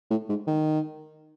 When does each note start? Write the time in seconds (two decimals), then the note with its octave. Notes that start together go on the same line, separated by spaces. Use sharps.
0.10 A2
0.29 G#2
0.47 D#3